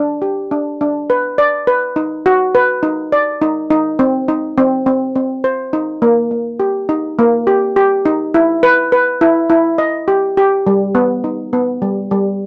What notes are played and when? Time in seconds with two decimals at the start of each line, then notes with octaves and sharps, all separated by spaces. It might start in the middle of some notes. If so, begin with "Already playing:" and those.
Already playing: D4
0.22 G4
0.51 D4
0.81 D4
1.10 B4
1.38 D5
1.67 B4
1.96 D#4
2.26 F#4
2.55 B4
2.83 D#4
3.12 D5
3.42 D#4
3.70 D#4
3.99 C4
4.28 D#4
4.58 C4
4.86 C4
5.16 C4
5.44 C5
5.73 D#4
6.02 A#3
6.31 A#3
6.60 G4
6.89 D#4
7.19 A#3
7.47 G4
7.76 G4
8.06 D#4
8.34 E4
8.63 B4
8.92 B4
9.21 E4
9.50 E4
9.78 D#5
10.08 G4
10.37 G4
10.67 G3
10.95 B3
11.24 D#4
11.53 B3
11.82 G3
12.11 G3